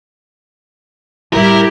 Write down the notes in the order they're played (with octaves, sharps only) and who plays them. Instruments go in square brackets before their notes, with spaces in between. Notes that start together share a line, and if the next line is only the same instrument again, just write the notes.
[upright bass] A2 G3 [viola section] E4 G4 [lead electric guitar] A#4